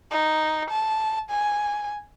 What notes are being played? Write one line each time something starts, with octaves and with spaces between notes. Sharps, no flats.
D#4
A5
G#5